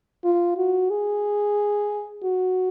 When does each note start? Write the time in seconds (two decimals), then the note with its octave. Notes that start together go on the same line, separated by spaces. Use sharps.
0.24 F4
0.57 F#4
0.90 G#4
2.23 F#4